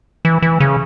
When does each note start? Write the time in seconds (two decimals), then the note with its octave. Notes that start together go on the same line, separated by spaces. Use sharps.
0.25 E3
0.42 E3
0.60 C#3